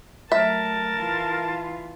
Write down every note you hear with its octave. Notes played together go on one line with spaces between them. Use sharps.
F#3 A3 A#4 E5 A5
E3 F4